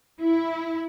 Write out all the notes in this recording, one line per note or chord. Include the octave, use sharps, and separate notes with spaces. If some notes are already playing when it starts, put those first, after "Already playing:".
E4